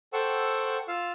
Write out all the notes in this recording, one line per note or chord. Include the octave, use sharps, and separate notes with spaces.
A4 C5 F#5 G5 C#6 E6
F4 F5 E6